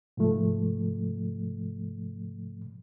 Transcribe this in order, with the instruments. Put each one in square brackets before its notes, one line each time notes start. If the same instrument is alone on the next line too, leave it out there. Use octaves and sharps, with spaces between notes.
[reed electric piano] G#2 C3 F3 A3